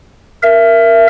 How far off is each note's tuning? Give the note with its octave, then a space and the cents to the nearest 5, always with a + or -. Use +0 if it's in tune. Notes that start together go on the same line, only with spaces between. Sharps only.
A#4 +0 E5 +25